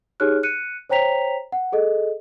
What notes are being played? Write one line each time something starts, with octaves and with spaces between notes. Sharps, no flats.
D#4 G4 G#4 C#5 F6 F#6
F#6 C#7 D#7
C5 C#5 G5 A#5 B6 F7
F#5
G#4 A4 D#5